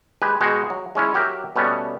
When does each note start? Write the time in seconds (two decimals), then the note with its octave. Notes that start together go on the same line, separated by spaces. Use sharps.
0.22 G#3 G4 B4 G#5
0.41 B2 G#3 F#4 G#4 G5
0.70 F#3
0.95 G#3 C#4 E4 C#5
1.14 F#3 G4 A#4 E5
1.56 B2 G3 A3 B3 C#4